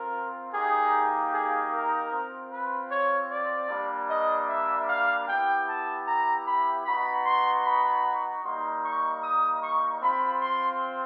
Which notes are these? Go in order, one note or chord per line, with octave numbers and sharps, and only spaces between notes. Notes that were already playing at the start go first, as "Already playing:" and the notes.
Already playing: C4 F4 A#4
A#3 D#4 G4 G#4
G#4
A#4
C4 F4
B4
C#5
D5
G3 A#3 D4
D#5
E5
F5
B3 E4 G4 G5
A5
A#5
B5
B3 D#4 F#4 B5
C6
B5
G3 A#3 D#4 C6
C#6
D#6
C#6
C4 F4 B5
C6